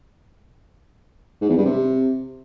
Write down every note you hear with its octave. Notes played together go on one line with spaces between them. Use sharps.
G#2
E2
G2
C3